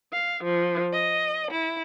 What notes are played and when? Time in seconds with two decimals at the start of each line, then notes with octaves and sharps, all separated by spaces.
0.10 F5
0.43 F3
0.93 D#5
1.52 E4